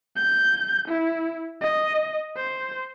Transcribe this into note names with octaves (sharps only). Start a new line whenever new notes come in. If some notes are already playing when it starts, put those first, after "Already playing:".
G6
E4
D#5
C5